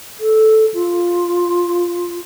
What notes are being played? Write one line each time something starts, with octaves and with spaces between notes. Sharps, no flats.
A4
F4